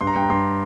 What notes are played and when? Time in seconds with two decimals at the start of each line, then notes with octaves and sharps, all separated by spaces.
0.01 G2 C6
0.07 A#5
0.16 G2 G5
0.22 A#5
0.30 G2 C6